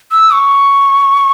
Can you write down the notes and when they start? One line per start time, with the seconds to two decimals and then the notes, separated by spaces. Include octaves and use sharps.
0.12 E6
0.33 C#6